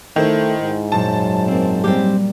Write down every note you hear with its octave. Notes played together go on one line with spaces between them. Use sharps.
D#3 A3 E4 C5
G#2
F#2 A#2 A5
A#3 C4
G3 A#3 C4 G4